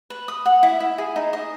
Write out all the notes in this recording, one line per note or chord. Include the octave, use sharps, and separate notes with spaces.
B4
D#6
F#5
E4
E4
G#4
D#4
D#5